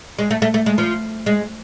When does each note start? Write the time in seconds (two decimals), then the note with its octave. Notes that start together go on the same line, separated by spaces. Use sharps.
0.19 G#3
0.31 A3
0.42 A3
0.54 A3
0.66 G#3
0.78 F3
1.26 G#3